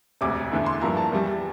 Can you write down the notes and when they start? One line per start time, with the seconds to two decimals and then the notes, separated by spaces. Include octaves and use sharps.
0.21 E1 D2 C3 D6
0.51 E2 D3 A3 E4
0.66 C6
0.81 G2 F3 A#3 E4 A#5
0.97 A5
1.12 E2 E3 G3